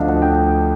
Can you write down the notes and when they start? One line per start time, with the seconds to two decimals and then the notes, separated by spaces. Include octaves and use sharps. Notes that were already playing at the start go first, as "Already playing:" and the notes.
Already playing: D2 D3 F3 A3 D4 D#5 F5
0.09 F#5
0.22 G5